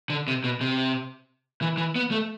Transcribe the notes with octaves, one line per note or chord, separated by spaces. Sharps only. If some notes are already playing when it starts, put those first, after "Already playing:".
D3
C3
B2
C3
E3
E3
B3
A3